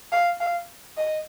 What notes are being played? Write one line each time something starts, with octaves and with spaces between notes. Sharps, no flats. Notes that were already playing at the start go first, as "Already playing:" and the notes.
F5
F5
D#5